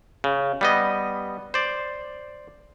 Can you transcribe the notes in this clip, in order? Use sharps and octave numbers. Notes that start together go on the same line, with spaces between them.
C#3
G3 B3 D#5
C5 D5